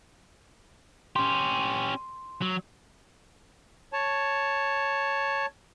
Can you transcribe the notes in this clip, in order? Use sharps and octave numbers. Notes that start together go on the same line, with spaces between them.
C#4 G4 C6
F#3
C#5 A5